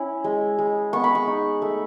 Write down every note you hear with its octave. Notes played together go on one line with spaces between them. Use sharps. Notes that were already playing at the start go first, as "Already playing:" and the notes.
Already playing: C#4 E4
G#3
G#3
B3 C#6
B5
C#6
D#4
A3